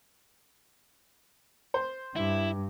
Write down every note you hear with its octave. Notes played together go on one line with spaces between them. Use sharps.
C5
G2 E4